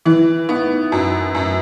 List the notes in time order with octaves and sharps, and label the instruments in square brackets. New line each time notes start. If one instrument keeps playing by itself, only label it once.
[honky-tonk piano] E3 [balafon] E4
[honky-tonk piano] B3 [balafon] D#4
[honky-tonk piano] F#2 [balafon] F#4
[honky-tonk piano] F#2